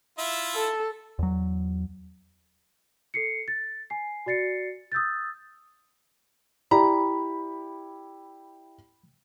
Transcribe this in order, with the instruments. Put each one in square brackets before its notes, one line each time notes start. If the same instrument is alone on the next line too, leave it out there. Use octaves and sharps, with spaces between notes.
[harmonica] E4 F4 E5
[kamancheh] A4
[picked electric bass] E2 F#3
[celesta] A4 C7 C#7
A6
G#5 C7
F#4 D5 A6 C7 C#7
D#6 E6 G6 A6
[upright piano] E4 G4 D5 [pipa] A#5 [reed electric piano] B5